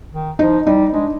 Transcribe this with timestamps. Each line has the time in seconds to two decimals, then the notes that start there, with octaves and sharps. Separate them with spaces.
0.12 D#3
0.39 F3 D#4
0.66 G3 D#4
0.93 G#3 D4